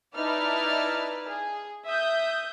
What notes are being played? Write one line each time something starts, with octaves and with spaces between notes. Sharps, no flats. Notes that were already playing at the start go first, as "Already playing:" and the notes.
D#4 E4 B4 D5 A5 F6
G#4
E5 D#6 G6